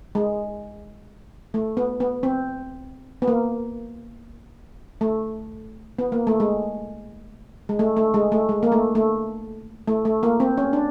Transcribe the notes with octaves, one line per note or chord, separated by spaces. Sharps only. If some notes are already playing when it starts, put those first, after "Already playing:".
G#3
A3
B3
B3
C4
B3
A#3
A3
B3
A#3
A3
G#3
G#3
A3
A3
G#3
A3
G#3
A#3
A3
A3
A3
A3
A#3
C4
C#4
D4